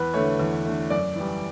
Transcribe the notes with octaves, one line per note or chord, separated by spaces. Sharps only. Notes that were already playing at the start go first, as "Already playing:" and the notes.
Already playing: E2 B4
D3 A3 C#5
E2
D3 A3
F#2 D5
E3 G3